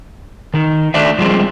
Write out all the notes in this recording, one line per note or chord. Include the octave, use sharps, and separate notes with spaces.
D#3 D#4
D#3 A3 D4 D5 E5
F3 G3 G#3 C4